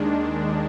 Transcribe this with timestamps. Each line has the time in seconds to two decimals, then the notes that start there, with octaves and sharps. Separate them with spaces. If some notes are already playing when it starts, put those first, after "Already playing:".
Already playing: D#2 D#3 G#3 D4